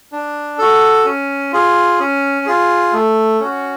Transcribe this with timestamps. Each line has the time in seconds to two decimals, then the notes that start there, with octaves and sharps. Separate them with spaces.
0.12 D4
0.59 F#4 A4
1.05 C#4
1.53 F4 G#4
2.00 C#4
2.46 F4 G#4
2.93 A3
3.40 C#4 F#4